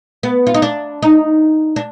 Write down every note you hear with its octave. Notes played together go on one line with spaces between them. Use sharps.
B3
F4
D#4
D4
D#4
D4